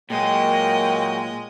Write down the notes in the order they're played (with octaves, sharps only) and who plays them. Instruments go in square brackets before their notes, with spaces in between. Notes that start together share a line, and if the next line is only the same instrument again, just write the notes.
[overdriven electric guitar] A#2 [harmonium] F#3 A#3 [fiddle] G#3 D#5 [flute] G5